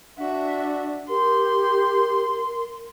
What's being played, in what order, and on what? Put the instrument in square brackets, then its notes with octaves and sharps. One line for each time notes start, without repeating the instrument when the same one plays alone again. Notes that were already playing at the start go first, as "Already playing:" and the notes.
[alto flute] D4 [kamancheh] F#4 E5
[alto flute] G4 [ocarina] A#4 [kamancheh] C6